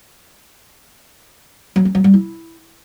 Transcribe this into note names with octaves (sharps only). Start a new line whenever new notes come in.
F#3
C#4
F#3
G3
E4